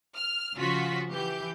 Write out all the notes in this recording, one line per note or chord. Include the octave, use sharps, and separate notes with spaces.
F6
C#3 F3 F4 F#4 B6
E3 G4 G6